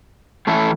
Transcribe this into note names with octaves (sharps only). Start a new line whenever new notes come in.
E3 A3 C#4 E4 A4